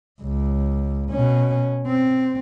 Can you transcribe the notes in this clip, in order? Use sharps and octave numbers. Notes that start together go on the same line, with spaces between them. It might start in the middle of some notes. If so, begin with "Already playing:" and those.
C#2
B2 C#4
C4